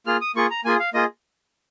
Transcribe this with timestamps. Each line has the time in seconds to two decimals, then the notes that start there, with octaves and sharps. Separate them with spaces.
0.07 A#3 F4 G#4 F6
0.21 D#6
0.36 A#3 F4 G#4 C#6
0.51 A#5
0.65 A#3 F4 G#4 G#5
0.80 F5
0.94 A#3 F4 G#4 D#5